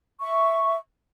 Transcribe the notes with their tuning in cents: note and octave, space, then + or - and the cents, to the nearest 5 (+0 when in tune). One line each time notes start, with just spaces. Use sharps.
E5 +0 C#6 +0